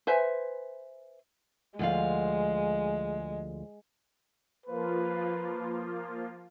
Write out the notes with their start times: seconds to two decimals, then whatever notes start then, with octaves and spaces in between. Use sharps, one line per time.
0.07 B4 C5 E5 G#5
1.79 D2 F3 G#3 F5
4.66 F3 A#3 F4 B4